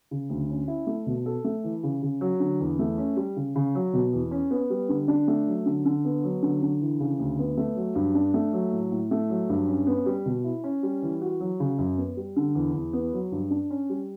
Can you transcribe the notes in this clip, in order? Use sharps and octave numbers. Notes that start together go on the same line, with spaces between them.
C#3
D2
C#4
E4
A3
B2
A4
A3
E3
C#3
C#3
F#3
D3
E2
A3
C#4
G3
C#3
C#3
F#3
B2
E2
C#4
B3
G3
D3
D4
A3
F#3
D3
D3
B3
F#3
D3
D3
E3
C#3
D2
B3
A3
F#3
G2
D4
A3
F#3
A2
A2
A3
F#3
G2
C#4
B3
G3
B2
E4
C#4
G3
E3
F#4
F#3
C#3
F#2
B3
G3
D3
E2
E2
B3
F#3
G2
D4
C#4
G3